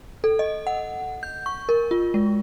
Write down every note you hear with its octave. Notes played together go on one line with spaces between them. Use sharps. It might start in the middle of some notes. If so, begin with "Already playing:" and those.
A4
D#5
F#5
G6
C#6
A#4
F4
G#3